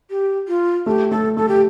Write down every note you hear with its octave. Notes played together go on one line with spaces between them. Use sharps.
G4
F4
A3 G4
A3 A4
A3 A4
G4